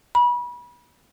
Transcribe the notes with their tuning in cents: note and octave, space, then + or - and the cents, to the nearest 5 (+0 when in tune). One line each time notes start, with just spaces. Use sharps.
B5 -30